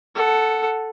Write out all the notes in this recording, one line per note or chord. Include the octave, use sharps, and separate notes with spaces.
A4 F#5